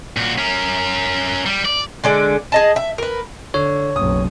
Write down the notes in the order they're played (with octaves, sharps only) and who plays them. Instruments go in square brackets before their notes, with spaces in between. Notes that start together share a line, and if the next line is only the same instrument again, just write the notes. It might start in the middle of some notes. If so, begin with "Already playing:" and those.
[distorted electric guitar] A#2 F#4
C#4 A#4
G3
D5
[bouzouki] D3 G#3 D5
G#4 D#5 A5
E5
A#4 B4
[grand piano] D3 [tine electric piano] C#5
[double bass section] F#1 B1 [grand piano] D#6